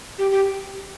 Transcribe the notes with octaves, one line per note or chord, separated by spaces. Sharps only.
G4
G4